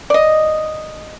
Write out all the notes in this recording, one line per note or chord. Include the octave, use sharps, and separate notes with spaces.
D5 D#5